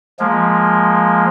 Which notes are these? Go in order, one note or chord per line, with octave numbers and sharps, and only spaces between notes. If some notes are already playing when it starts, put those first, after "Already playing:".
F3 G#3 A#3